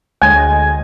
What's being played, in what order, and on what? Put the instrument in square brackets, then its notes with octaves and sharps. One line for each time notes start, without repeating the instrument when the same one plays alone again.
[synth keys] D2 G#3 D#5 [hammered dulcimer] G#5